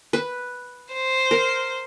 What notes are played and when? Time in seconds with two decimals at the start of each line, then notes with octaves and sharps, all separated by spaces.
0.13 B4
0.93 C5
1.31 A#4